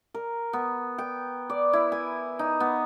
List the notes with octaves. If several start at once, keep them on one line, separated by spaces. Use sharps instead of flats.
A#4
B3
G5
D5
E4
G#5
D#4
B3